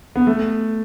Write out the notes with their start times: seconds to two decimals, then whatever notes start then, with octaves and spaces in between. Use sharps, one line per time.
0.16 B3
0.27 A3